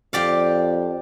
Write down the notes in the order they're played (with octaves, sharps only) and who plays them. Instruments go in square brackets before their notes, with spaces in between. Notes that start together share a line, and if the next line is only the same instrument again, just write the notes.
[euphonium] F2 [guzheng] G4 D5 F5